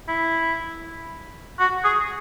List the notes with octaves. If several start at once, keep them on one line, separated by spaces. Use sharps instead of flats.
E4
F#4
G#4